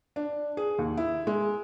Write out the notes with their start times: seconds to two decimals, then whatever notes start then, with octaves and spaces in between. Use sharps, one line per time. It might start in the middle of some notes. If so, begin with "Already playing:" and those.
0.16 D4
0.57 G#4
0.78 D#2
0.97 E4
1.27 G#3